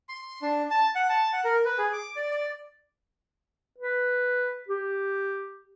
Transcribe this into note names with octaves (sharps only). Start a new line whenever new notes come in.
C6
D4
A5
F#5
A5
F#5
A#4
B4
G#4
D6
D5
D5
B4
G4